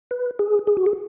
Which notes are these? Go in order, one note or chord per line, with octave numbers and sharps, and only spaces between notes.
B4
G#4
G#4
F#4
G#4